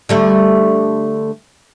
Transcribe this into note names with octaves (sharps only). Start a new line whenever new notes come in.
D3 G3 A3